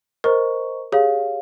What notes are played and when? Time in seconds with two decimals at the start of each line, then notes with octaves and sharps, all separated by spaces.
0.24 A#4 C5 D#5 A#5 C#6
0.92 G4 G#4 C#5 F5